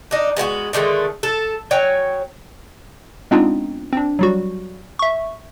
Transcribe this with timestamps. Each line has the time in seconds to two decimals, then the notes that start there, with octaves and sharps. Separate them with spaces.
0.11 D4 D#4
0.36 G#3 B3 F4 F#4
0.73 D3 D#3 G#3 A3
1.23 A4
1.71 F#3 C#5 G5 G#5
3.31 G#3 B3 C4 D4 D#4 F4
3.93 C4 D4
4.19 F#3 G3 F#4
4.99 E5 C#6